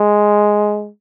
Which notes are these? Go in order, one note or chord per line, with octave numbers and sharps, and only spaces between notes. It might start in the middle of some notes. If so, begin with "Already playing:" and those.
Already playing: G#3